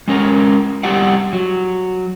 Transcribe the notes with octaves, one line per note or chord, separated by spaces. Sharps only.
G#3 C#4 A#4
G3 E4 G4 D5 F#5
F#3